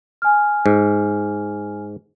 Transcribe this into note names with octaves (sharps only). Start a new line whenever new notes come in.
G#5 F6
G#2